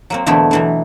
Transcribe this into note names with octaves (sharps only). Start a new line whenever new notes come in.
F#3 A#3 C4
E2 B2 D3 A3 E4
B2 E3 F#3